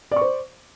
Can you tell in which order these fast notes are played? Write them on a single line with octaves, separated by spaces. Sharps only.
D5 C#6 C5